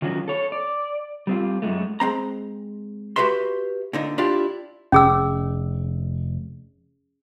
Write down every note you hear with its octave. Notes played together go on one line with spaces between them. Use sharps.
D#3 F3 F#3 C#4 F#4
A4 C#5
D5
G3 C4 F4
F#2 G#3 A3
G#3 C4 A#5
F#4 G4 B4 E5 C6
A#2 D3 D#4
D4 E4 F4 G4 D5
F1 C#4 G#4 E6